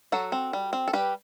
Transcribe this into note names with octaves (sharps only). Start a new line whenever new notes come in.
F#3 F#4 A4
C4
G3
C4
A4
G3 G4 B4